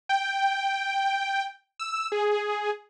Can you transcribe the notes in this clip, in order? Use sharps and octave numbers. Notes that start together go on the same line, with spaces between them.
G5
E6
G#4